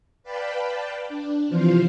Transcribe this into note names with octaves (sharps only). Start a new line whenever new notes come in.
B4 D5 F5 G5 A5 B5
D4
C3 E3 F3 F4 C5 F5